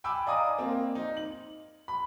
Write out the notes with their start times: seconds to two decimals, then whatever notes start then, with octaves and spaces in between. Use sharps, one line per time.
0.04 G5 G#5 B5 D6 E6
0.27 D5 D#5 F5 G#5 A#5 D#6
0.58 A#3 C4
0.95 D#4
1.17 F#7
1.88 B5